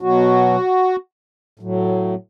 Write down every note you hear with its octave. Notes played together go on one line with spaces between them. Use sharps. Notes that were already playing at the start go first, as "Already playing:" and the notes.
B2 F#3 F#4
A2 F#3